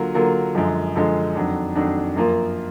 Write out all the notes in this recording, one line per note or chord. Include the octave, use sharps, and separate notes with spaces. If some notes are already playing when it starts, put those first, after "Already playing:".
Already playing: D3 F#3 A#3 F4 A#4
D3 F#3 A#3 F4 A#4
F#2 D3 F3 G#3
F#2 D3 F3 G#3
F2 D#3 F#3 D4
F2 D#3 F#3 D4
F#2 F3 A#3 F4 A#4